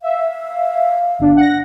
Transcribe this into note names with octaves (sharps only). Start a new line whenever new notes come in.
E5 F5
G1 D4
F#5 A#6